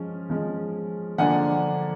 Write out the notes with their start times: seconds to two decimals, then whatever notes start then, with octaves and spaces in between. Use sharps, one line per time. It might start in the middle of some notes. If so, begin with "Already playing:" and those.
Already playing: F3 G#3 C#4
0.30 F3 G#3 C#4
1.18 D3 F3 A#3 D4 F#5 G#5